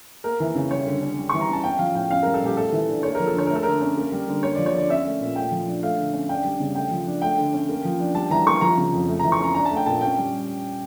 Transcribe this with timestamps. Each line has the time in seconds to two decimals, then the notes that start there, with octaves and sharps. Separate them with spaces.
0.24 A#3 A#4
0.40 E3
0.55 C#3
0.71 G3 C#5
0.87 D3
1.02 C#4
1.18 G3
1.29 E3 C#6
1.41 A#5
1.49 C#4 A5
1.63 C#4 G5
1.79 F3 F5
1.95 A2 G5
2.11 C#4 F5
2.23 G3 A#4
2.34 A4
2.42 A#2 G4
2.57 A3 A4
2.72 E3
2.88 D4
3.03 A#3 C#5
3.15 F3 A#4
3.27 A4
3.34 D3 C#5
3.46 A#4
3.50 A3
3.55 A4
3.63 D3 A#4
3.81 C#4
3.97 A#3
4.12 G3
4.28 D3
4.43 A#3 C#5
4.55 F3 D5
4.66 C#5
4.73 D3 D5
4.89 C#4 E5
5.05 A3
5.21 A#2
5.36 A3 G5
5.52 F3
5.67 D4
5.82 A3 F5
5.98 D3
6.13 C#4
6.29 D4 G5
6.45 G3
6.60 C#3
6.75 A3 G5
6.91 F3
7.07 D4
7.22 A3 G5
7.38 D3
7.53 C#4
7.69 A#3
7.85 F3
7.99 D4
8.15 G3 A5
8.30 E3 A#5
8.46 A#3 C#6
8.61 F3 A#5
8.77 C#3
8.93 F2
9.08 A3
9.19 E3 A#5
9.32 C#6
9.39 C#4 A#5
9.55 D4 A#5
9.65 A5
9.71 A3
9.76 G5
9.86 A#2 A5
10.01 C#4 G5
10.17 G3